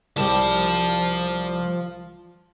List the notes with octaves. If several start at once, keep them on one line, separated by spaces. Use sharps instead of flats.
C2 F3 G3 A5